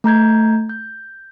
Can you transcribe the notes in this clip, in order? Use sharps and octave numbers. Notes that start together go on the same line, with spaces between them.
A3 A#5 G6 G#6
G6